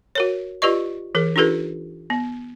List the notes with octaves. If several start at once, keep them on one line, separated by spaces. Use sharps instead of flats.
F#4 A#4 C#5
F4 G4 B4 D5 D#5 C#6
E3 G#4 A#4
D4 D#4 F4 G4 A4 B4
B3